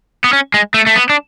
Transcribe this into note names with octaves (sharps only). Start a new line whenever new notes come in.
B3
C#4
G#3
A3
A3
B3
D4